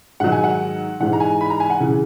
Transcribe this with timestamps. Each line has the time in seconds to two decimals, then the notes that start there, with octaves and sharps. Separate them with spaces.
0.20 G#2 D#3 F#3 F#5
0.32 G#5
0.44 F#5
1.00 G#2 E3 F#5
1.13 A#5
1.20 G#5
1.41 B5
1.50 A#5
1.60 G#5
1.70 F#5
1.80 C#3 E3